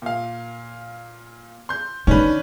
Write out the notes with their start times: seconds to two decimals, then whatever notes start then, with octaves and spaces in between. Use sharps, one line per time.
0.02 A#2 F5
1.69 C6 G6
2.07 D#3 C#4 D4 B4